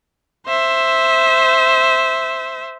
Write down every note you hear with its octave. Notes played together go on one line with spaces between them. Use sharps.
C5 E5